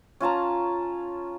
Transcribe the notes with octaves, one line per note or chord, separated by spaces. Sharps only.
C#4 F4 A5 A#5